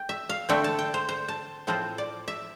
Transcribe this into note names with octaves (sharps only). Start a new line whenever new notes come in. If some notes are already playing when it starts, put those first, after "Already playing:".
Already playing: G5
E5
F5
D3 A3 C4 G5
A5
G5
C5
C5
A5
A2 F3 C4 F4 C5
D5
E5